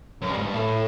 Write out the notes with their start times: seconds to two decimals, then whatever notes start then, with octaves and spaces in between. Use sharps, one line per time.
0.22 F#2
0.29 G2
0.38 G#2
0.45 G2
0.54 A2